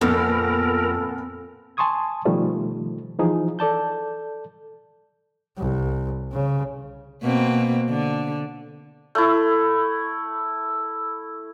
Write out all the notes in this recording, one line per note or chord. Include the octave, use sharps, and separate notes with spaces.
F2 A#2 B3 A4 A#4
G#5 A5 C6 C#6 D#6 G#6
B2 D#3 F3 G3 A3
E3 F3 D#4 G#4
A4 D5 A5 G6
C2
C#3
B2 A#3 C4
D3
A3 E4